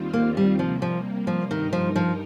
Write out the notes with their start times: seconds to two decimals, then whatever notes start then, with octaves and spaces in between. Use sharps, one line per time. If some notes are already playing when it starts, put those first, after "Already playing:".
Already playing: D#2 D#3 G3 C4 F4
0.13 A#3
0.37 G3
0.59 C3 F3 G3 A#3
0.82 F3
1.27 F3
1.50 G2 D#3 G3 D#4 A#4
1.73 F3
1.96 F3